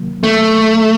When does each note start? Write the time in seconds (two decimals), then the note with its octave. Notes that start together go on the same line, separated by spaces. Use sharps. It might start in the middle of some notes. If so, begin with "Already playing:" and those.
Already playing: C3 D#3 F#3 A#3
0.23 A3